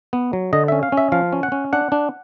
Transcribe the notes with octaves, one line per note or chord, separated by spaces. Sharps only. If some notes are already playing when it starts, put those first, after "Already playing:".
B3
F#3
D3 D#5
C#4 E5
F5
C#4
E5
F3 F5
C#4
F#5
C#4
D4 F#5
D4